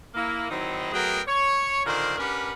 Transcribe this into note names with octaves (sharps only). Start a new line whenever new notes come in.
A#3 E4
D#3 F#3 C4 D#4 E4
F#3 A3 B3 G#4 A#4 G5
C#5
A#2 D3 D#3 A#4 C5 D5
C#4 D4 G4 A#4 B4 F#5